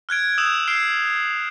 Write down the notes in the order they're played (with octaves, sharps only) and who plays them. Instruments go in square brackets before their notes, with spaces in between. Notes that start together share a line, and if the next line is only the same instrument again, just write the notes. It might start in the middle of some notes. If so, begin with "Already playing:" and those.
[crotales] F6 F#6 G#6 D7
D#6 E6 G6 E7 F7
F6 C7 D7